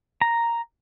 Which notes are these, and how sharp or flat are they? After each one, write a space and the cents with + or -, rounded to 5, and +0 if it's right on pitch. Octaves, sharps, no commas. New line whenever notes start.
A#5 +0